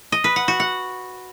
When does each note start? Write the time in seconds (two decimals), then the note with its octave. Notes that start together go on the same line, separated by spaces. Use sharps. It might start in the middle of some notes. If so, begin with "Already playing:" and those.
0.12 D#5
0.24 B4
0.36 F#5
0.48 F#4
0.60 F#5